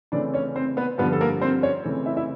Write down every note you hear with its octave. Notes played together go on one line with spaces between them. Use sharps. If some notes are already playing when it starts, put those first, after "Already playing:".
C#3 E3 A3 C4 D4 D5
C#4 C#5
C4 C5
B3 B4
G2 D3 F3 B3 B4
A4
A#3 A#4
C4 C5
C#4 C#5
C#3 E3 A3 C4
E4 E5
E4 E5